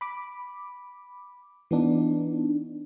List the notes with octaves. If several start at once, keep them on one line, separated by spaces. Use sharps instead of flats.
B5 D6
E3 B3 D4 D#4